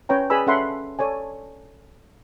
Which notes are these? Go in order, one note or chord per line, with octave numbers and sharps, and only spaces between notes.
C#4 B4 C#5 G5 A#5
G#4 B4 D5 G#5 B5 E6
C#4 A4 E5 F#5 B5 C6
A4 C#5 D5 G#5